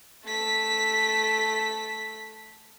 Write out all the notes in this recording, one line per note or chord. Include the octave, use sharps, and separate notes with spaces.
A3 B6